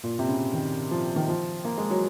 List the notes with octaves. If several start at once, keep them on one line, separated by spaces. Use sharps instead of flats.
A#2
C3
C#3
D#3
F3
D#3
F3
A#3
G#3
F#3